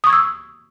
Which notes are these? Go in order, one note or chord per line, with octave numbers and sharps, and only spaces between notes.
C#6 D#6 E6 G#6